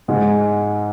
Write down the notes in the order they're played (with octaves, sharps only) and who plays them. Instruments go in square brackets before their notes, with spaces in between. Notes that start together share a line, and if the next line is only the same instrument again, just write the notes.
[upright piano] G#2 G#3